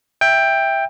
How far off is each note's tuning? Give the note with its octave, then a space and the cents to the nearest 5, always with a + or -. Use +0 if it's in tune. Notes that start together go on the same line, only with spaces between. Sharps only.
E5 +0 G5 +15